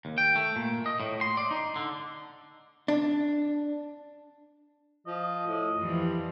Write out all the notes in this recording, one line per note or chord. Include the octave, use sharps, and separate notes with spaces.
D#2
G5
A3
A#2
D#5
A2
C6
D5
D#4
D3
D4
F3 D#5
A2
F2 E3 F3 G3